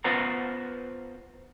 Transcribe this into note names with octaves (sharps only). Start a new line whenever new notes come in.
B3 F4 B4 C5 F#5 A#5